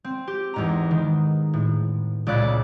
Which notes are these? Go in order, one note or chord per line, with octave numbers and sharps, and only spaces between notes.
C4
G4
E2 G#2 A#5
D#3
A2
C#2 A#2 D5 B5 D6 F#6